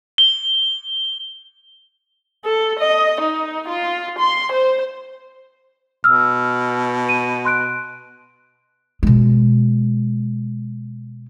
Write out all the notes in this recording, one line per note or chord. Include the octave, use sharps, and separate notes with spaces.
G7
A4
D#5
D#4
F4
C6
C5
B2 E6 F6
D#7
C6 F#6 D7
B2 G#3